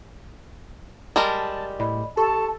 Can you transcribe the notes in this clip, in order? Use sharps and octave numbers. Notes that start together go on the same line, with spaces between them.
G3 G#3 A#4 A5
A2 D5 D#5 B5
G4 A4 A5 C#6